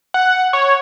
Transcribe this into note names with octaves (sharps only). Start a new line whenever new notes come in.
F#5
C#5